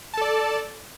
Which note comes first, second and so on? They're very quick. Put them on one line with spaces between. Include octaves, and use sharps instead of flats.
A5 A4 D5